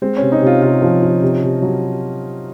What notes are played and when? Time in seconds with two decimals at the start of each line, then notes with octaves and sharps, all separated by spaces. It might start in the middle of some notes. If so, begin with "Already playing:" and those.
0.02 G#3 C4
0.17 C#4
0.22 C3
0.32 D#4
0.42 C3 F4
0.62 C3 F4
0.82 F3
1.03 F3
1.22 C3
1.42 C3
1.62 F#3